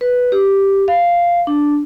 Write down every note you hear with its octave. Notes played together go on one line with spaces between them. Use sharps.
B4
G4
F5
D4